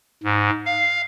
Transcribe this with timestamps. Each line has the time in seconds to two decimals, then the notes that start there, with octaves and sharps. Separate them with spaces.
0.24 G#2
0.66 F5